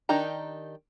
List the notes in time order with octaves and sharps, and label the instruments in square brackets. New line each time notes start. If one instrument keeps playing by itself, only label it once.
[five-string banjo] D#3 D4 D#4 G4 A#5